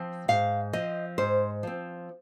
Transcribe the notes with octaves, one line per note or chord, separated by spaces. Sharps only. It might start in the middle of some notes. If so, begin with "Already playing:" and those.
Already playing: F3 C4
G#2 F5
F3 C4 D#5
G#2 C5
F3 C4